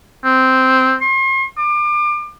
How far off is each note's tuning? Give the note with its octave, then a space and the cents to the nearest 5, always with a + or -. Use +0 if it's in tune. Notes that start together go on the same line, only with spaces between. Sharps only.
C4 -5
C6 +40
D6 +30